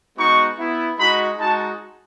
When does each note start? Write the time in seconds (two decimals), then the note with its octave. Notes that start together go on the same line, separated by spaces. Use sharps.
0.16 G#3 B3 D#4 F#4 C#6
0.57 B3 E4
0.98 G#3 D#4 F#4 B5
1.38 G#3 D#4 F#4 A5